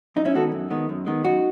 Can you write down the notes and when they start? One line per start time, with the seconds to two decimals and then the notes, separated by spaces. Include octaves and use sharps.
0.16 F#2 D#4
0.25 C#4 E4
0.34 D#3 G#3 B3 F#4 A4
0.52 F#2
0.70 D#3 G#3 B3
0.89 F#2
1.06 D#3 G#3 B3
1.24 F#2 D#4 F#4